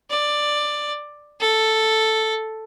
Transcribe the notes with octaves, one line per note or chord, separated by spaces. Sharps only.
D5
A4